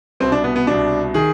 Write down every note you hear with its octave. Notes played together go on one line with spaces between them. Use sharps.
C2 B2 C4
D4
B3
B3
C2 B2 D4
D#3 G#4